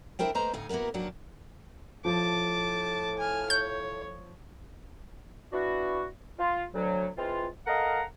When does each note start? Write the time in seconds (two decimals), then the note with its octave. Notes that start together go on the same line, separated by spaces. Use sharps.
0.19 D4 E4 A#4 C5 G5
0.35 A3 A#3 B4 C5 D#5 A#5
0.53 D2 A2 D#4 F5 G#5
0.69 A#3 B3 E4 F#4 A#4
0.94 D#3 F#3 A#3 D4 F#4
2.05 A2 F3 A5 D6
3.18 G#5 F6
3.50 C#5 G6
5.53 B3 D4 E4 F#4
6.38 F4
6.74 D2 F#3
7.17 E3 G#3 C4 F4
7.66 A4 A#4 D#5 F5 F#5 A#5